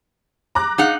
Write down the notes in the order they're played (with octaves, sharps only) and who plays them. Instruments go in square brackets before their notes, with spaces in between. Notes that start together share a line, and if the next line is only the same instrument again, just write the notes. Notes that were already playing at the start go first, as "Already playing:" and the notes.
[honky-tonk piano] A#5 D6 F#6
[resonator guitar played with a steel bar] D#4 F5 F#5 [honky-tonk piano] G#4